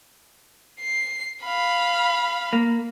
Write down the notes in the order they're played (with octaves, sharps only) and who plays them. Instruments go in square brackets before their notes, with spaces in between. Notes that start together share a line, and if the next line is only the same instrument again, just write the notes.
[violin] C7
F5 B5
[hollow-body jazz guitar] A#3